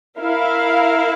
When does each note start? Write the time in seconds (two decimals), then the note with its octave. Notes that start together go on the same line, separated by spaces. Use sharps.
0.19 E4 A#4 F5